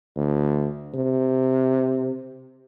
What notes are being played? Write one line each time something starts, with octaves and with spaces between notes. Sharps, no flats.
D2
C3